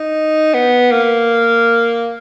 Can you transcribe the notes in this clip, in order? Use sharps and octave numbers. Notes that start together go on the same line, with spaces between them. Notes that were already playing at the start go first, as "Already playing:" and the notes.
Already playing: D#4
B3
A#3